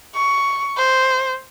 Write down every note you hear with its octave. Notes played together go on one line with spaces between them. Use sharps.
C#6
C5